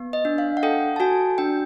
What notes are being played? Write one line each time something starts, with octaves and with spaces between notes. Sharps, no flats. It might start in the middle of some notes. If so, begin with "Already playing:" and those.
Already playing: B3
D#5
D4
F5
F#5
A4 G5
A5
F#4 G#5
D4 G5